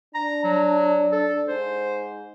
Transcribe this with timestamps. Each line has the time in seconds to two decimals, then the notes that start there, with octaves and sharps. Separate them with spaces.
0.15 D4 A#5
0.44 F#3
1.12 A4
1.48 G#2 C5